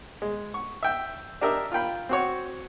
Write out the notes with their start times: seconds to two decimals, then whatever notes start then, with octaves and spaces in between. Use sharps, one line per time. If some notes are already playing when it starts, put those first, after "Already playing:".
0.22 G#3
0.54 C#6
0.83 E5 G5
1.41 D4 G4 A#4 D#5 E5
1.72 F4 A#4 G5 B5
2.09 C4 F#4 C#5